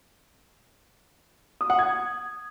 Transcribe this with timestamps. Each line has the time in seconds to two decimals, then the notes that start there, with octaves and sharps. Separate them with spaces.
1.61 D#6
1.70 F#5
1.79 G#6